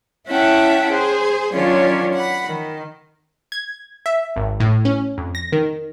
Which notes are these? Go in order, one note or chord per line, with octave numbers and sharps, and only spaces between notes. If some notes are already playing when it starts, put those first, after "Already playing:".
C#4 E4 E5 F#5 G5 A5
G#4 C5
D#3 F#3 C#4 D4 F4 C#5
F#5 B5
D#3
G#6
E5
G#1
A2
C#4
F2
A#6
D#3